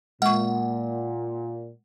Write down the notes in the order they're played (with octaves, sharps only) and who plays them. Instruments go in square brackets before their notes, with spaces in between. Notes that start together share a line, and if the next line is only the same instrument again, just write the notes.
[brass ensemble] A#2 [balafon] G#3 C#6 [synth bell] F#5